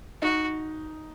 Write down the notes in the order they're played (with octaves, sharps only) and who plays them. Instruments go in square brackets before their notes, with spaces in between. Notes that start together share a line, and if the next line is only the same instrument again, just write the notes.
[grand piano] D#4 [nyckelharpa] F#4